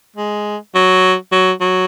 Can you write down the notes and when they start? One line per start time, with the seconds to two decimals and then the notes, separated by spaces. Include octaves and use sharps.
0.16 G#3
0.74 F#3
1.32 F#3
1.61 F#3